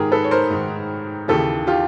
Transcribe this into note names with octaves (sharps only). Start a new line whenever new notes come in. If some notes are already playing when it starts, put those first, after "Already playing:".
Already playing: G#2 D#3 G4 G#4 A#4
A4 B4
C#5
A#4 C5
G#2 D#3
D#2 C#3 E3 G4 A4
F4 G4